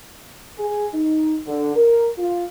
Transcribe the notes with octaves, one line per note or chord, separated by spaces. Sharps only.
G#4
D#4
D3
A#4
F4